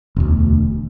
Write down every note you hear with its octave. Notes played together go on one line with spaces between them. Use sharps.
E1 D2